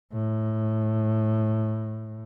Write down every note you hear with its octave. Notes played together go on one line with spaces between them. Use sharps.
A2